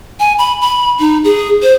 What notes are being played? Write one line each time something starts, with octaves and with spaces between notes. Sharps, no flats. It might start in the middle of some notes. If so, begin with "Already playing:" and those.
G#5
B5
B5
D#4
G#4
C5